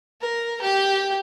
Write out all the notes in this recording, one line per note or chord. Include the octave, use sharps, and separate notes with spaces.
A#4
G4 G5